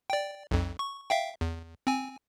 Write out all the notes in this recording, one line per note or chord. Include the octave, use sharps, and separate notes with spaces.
D5 G5
B1 F2
C#6
E5 F5 G5
E2
C4 G#5